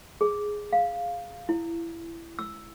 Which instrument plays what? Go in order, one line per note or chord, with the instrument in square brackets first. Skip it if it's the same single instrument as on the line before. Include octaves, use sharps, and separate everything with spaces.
[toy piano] G#4
F5
E4
E6